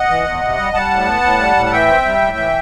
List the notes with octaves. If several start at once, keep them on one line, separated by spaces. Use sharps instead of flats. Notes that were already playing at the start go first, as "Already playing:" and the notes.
Already playing: D#5 F#5
E3
E2
C3
G3
G3 F#5 A5
A2
B3
A2
G3
A2
A5
E3 E5 G5
C4
G3
A2
E3